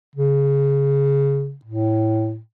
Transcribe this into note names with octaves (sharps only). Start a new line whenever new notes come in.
C#3
A2